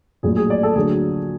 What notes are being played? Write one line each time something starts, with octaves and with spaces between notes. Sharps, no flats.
A#1 A2 F#3 G#4
G#4
D5
A4
D2 D3 F#3 G#4